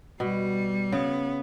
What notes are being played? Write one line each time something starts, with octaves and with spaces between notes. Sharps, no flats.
B2 G3
C#3 B3